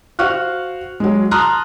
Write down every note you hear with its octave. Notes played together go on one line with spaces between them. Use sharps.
F#4 C5 F5 C#6 F6 F#6
F#3 G#3
A5 A#5 C6 D#6 F6 F#6